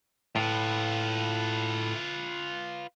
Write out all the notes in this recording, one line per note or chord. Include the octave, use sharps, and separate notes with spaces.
A2 F4 B4